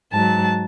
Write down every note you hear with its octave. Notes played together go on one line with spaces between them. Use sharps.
G#2 F#3 A5